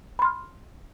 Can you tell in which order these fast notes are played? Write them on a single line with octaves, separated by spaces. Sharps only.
B5 C6 F6